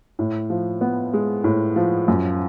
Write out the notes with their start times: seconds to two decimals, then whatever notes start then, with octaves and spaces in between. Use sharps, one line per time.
0.19 A2
0.50 F3
0.81 B3
1.13 G#3
1.44 A2
1.76 F3
2.08 F#2